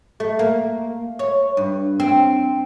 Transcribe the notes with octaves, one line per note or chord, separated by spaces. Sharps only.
A3
A#3
C#5
G2
C4